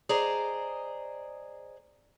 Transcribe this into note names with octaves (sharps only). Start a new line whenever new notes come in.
G#4 C5 D5 D#5 A#5